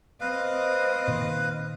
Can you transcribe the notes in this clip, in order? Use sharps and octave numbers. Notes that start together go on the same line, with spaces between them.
C4 B4 D#5 F5
A#2 D#3